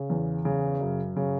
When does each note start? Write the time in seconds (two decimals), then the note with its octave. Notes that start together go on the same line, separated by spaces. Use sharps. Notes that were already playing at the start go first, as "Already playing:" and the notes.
Already playing: C#3
0.10 E2
0.45 C#3
0.81 F#2
1.16 C#3